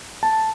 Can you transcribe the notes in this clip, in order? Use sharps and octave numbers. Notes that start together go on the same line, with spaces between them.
A5